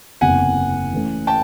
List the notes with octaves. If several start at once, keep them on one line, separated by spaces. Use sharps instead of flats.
F#1 E2 C3 F#5 G#5
E3 A3 C#4
G5 A5